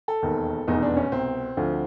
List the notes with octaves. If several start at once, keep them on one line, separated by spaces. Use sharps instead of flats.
A4
E1 D#2 D#3
F1 E2 B2 D#4
D4
C#4
C2 B2 C4
D2 D3 F3